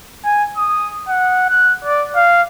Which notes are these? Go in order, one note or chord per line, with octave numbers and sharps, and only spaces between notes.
G#5
D#6
F#5
F#6
D5
F5